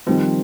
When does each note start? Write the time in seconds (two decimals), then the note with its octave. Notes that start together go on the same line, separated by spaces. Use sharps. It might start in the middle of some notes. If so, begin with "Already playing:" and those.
0.07 D#3 F3 G3 C4